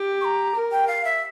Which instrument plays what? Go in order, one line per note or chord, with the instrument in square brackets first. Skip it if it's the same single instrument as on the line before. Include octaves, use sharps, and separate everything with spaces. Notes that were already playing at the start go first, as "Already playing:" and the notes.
Already playing: [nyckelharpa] G4
[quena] C#6
A#5
[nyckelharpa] A#4
[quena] G5
F5
E5